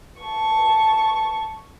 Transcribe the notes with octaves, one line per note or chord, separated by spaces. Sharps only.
A5 C#6